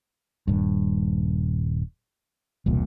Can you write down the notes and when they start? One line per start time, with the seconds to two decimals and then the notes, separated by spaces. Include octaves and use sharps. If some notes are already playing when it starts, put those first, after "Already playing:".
0.48 D#1 G2
2.66 E1 C2 A#2